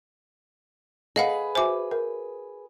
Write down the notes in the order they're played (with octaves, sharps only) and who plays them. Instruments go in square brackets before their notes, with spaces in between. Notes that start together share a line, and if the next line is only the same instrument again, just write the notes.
[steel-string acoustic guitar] G#4 B4 [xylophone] D#5 F5 F#5
[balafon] F#4 E5 G#5 [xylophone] C5 D6
[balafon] A#4